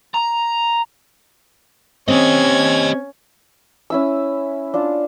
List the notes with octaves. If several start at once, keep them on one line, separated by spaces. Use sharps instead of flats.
A#5
C4 C#4 G4 D#5 G#6
C#4 E4 E6
D4 F4